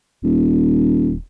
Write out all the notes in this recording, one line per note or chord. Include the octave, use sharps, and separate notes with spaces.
D#1